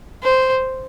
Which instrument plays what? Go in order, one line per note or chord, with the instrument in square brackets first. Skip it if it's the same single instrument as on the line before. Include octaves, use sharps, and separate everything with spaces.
[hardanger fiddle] C5